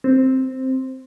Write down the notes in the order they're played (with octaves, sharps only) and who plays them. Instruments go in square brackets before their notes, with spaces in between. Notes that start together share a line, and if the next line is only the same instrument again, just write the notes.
[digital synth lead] C4